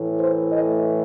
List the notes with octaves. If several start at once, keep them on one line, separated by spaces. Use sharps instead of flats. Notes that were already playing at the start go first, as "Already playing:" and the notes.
Already playing: A2 E3 A3
C5
D#5